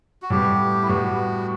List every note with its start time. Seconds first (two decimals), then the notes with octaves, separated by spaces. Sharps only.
0.22 F#4
0.30 A2 G3 B3 G4
0.82 E4
0.87 A2 G3 B3 F#4